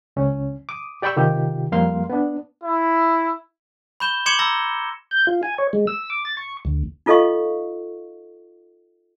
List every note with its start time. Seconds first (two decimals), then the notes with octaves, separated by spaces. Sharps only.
0.16 C#2 C#4
0.69 D6 D#6
1.02 G4 D5 G5 B5 C#6 E6
1.16 C3 D#3 F4 G4
1.72 F2 G3 A#3 F5 C6
2.10 B3 D4
2.63 E4
4.00 B5 C#6 G6 E7 G7
4.26 C6 D6 G#6 C#7 E7 G7
4.39 A#5 B5 E6 A#6
5.11 G6
5.27 F4
5.43 G#5
5.58 C#5
5.73 G#3
5.87 E6
6.10 D6
6.25 A6
6.37 C#6
6.65 D2
7.06 D#4 F4 A4 D#5 F5 C#6